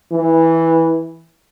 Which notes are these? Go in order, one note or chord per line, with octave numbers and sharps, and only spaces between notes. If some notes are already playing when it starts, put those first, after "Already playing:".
E3